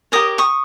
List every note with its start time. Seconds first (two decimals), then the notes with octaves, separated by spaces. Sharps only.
0.12 G4 A#4 C#5 D#6
0.38 C#6 D#6